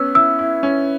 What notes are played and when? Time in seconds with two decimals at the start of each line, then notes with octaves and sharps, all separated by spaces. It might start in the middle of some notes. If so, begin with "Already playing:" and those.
Already playing: B3 C#4 E6
0.14 E4 E6
0.39 E4
0.63 C#4